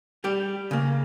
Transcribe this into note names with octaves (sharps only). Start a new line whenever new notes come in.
G3 G4
C#3 A#3